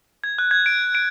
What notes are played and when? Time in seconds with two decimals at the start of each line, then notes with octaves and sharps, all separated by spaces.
0.24 G#6
0.38 F#6
0.51 G#6
0.66 D7
0.95 D7